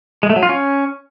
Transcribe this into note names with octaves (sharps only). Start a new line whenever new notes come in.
G#3
A3
F#3
F4
C#4